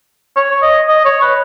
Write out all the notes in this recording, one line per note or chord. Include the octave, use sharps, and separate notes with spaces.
C#5
D#5
D#5
C#5
B4